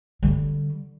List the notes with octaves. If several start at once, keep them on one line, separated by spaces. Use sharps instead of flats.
D3 G3